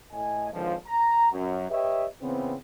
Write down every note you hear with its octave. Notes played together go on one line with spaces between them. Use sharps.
A2 D#5 G#5
G#1 C#2 D3 F3
A#5
F#2
G4 B4 C#5 D#5 E5
C#3 E3 B3 C4